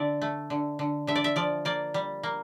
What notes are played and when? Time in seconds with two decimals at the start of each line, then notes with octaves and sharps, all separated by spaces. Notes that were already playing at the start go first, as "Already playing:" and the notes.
Already playing: D3 D5 E5
0.21 A3
0.50 D3
0.79 D3
1.07 D3 E5
1.15 D5
1.24 E5
1.36 F3 D5
1.65 A#3 D5
1.94 G3
2.23 A#3